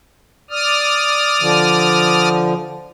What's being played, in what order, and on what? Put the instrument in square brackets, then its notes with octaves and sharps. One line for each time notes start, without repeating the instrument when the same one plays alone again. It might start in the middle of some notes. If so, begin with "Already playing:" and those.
[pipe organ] D5 D#6 F6
[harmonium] D3 F3